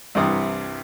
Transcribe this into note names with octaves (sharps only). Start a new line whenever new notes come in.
C2 G2 C3 E3 D#6